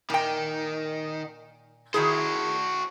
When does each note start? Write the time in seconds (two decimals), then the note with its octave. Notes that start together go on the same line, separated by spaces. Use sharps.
0.10 A#2 D#3 G5
1.94 D#3 E4 F#4 G#4 C5